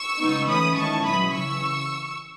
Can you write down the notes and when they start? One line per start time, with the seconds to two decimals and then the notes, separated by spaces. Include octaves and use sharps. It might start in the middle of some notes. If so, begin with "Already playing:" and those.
Already playing: C#6 E6
0.20 C#3 G#3 B3 D#4
0.48 E3 A3 C#4 B5 D#6
0.77 D#3 G#3 C#4 E4 A5 C#6
1.05 B2 F#3 C#4 E4 B5 D#6
1.34 C#3 E3 C#6 E6